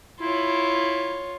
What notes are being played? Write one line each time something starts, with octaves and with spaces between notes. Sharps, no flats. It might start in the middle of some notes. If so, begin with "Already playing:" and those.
E4 F4 C#5